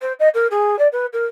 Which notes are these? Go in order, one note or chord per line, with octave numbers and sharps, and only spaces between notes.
C5
D#5
A#4
G#4
D5
B4
A#4